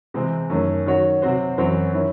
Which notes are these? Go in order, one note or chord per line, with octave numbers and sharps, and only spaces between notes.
C3 E3 G#3 C4
F#2 D#3 A3 C#4
D#3 F#3 C#4 F#4 C#5
C3 F#3 C4 F#4 C5
F#2 E3 C4 F#4 C#5
D#3 F#3 C#4 E4